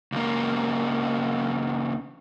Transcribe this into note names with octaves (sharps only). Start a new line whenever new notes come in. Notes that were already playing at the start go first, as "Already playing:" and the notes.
C#2 A#3